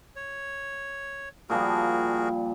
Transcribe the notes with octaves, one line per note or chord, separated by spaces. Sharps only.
C#5
A#2 F3 G3 F#4 G#4 A#4